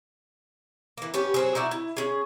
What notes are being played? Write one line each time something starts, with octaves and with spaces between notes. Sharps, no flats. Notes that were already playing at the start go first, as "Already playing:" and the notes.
E3 A#3
B3 C#4 G4
F#3 C4 G#4
D#4 E4 F#4 D5
E4
C#4 G#4